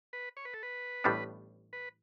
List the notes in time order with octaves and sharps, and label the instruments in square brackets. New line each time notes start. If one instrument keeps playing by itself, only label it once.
[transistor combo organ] B4
C#5
B4
A4
B4
[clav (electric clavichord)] A1 A2 G3 B3 D4
[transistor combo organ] B4